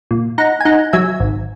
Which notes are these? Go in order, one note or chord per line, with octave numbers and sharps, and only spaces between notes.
A#2
D#4 F#5 A#5
G#5
D#4 F#5 A#5
F#3 E5 G#5
G#1